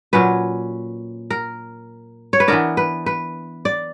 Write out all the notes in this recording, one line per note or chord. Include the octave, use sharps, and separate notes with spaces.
A#2 F#3 C#4 B4
A#4
C#5
B4
E3 B3 D4 A#4
B4
B4
D5